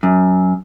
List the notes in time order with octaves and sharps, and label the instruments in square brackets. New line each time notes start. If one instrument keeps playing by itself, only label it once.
[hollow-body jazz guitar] F#2